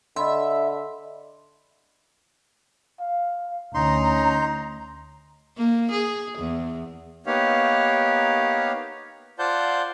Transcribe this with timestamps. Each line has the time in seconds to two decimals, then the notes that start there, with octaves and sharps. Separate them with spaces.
0.16 D3 D#5 E5 B5 C6
3.00 F5
3.74 D2 C#4 D#4 A#5 C6
5.57 A#3
5.91 G#4
6.38 E2
7.26 A#3 B3 D#4 G4 C#5 F5
9.39 F4 C5 D5 F#5 A5 G6